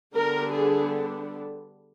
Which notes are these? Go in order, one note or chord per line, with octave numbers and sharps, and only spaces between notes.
D3 G3 B3 D4 A#4
G#4